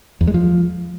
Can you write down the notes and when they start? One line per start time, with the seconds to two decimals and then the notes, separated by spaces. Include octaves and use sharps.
0.21 E2
0.27 G#3
0.34 F3